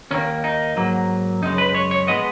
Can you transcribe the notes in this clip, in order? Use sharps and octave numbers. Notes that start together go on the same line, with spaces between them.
D#2 D#3 A#3 C#4
D#4
G#2 F#3 A#3
F#2 C#3 G#3 D#4
B4
C#5
C#5
A#2 G#3 B3 D#5